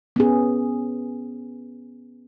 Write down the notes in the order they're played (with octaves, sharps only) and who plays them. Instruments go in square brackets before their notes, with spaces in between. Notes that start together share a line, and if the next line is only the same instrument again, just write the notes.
[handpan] B3 C#4 G#4